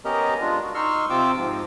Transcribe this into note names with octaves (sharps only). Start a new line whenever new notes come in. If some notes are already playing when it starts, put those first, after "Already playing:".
B3 C#4 G4 A#4 D#5 A#5
G#3 D4 F4
F#4
D#4 C6 C#6 E6 F6
C3 C4 F4 D6 E6
G#2 F3